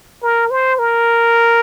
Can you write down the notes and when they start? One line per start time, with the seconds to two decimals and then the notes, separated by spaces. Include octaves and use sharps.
0.23 A#4
0.51 C5
0.79 A#4